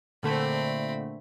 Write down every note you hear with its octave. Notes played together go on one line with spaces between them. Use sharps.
A#2 D3 A3 C4 B5